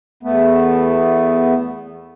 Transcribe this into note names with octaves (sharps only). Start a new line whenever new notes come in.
E2 A3 B3